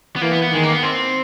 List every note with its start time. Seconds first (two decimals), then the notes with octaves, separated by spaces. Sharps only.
0.16 B3
0.22 E3 A#3
0.32 B3
0.42 B3
0.52 D#3 G#3
0.63 A#3
0.72 B3
0.83 C4